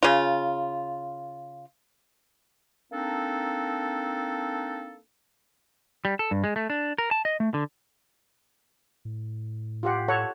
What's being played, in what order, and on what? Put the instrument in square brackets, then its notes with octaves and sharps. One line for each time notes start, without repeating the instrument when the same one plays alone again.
[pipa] C#3 F4
[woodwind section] A#3 C4 D4 D#4 A4
[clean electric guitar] G3
A4
G2
G#3
A3
D4
A#4
A5
D#5
A3
D3
[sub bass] A2
[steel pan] F4 G4 F#5
A4 C#5 F#5